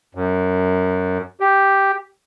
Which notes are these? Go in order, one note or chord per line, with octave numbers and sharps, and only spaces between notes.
F#2
G4